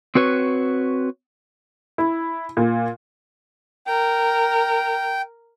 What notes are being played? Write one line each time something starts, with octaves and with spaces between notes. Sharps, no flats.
C4 F#4 B4 C#5
E4
A#2
A#4 G5